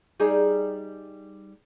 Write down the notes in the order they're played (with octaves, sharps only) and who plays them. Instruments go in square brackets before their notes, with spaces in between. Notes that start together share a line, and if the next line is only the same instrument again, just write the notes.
[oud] G3 D#4 G#4